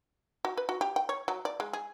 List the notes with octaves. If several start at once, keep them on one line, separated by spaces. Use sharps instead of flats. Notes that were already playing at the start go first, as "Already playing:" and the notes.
F#4
B4
F#4
G4
G5
C#5
F#3
D5
G#3
G#4